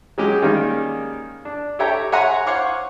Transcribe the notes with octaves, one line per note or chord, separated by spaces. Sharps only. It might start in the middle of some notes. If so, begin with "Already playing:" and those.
F#3 G#3 C#4 G4
D#3 G3 G#3 A#3 C#4 D#4
D4
G4 A4 C#5 E5 G5 A#5
C#5 E5 F#5 G#5 A#5 C6
C5 C#5 F5 F#5 C#6 D6